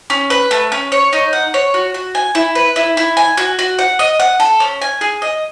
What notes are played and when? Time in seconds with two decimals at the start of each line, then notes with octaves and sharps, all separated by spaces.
0.10 C#4
0.30 B4
0.51 A3
0.72 C#4
0.92 C#5
1.13 D#4
1.33 F#5
1.54 C#5
1.74 F#4
1.94 F#4
2.15 G#5
2.35 E4
2.55 B4
2.76 E4
2.97 E4
3.17 G#5
3.37 F#4
3.59 F#4
3.79 F#5
3.99 D#5
4.20 F#5
4.40 A4
4.60 C#4
4.81 G#5
5.01 G#4
5.22 D#5